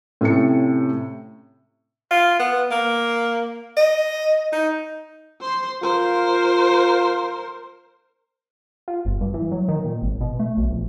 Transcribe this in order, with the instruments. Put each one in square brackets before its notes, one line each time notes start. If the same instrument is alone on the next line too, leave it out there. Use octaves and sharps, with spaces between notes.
[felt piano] A2 C3 C#4 A4 C#7
[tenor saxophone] F4
B3
A#3
D#5
D#4
[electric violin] C5 C6
[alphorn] F4 [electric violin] A#4 C5
[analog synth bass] F4
G1
G2
E3
F#3
D#3
A#2
G#1
B2
A3
B1
A#1